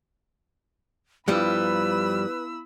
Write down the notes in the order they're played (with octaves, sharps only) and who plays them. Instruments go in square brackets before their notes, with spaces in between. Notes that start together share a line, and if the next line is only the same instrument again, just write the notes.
[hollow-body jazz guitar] G2 F3 G3 [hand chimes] B3 E4 [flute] B4 [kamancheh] B5 E6